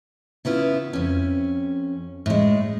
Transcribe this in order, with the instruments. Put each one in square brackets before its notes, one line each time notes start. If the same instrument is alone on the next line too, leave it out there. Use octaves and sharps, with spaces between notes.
[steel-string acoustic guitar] C#3 B3 E4 F4
F2 C#4
A2 G#3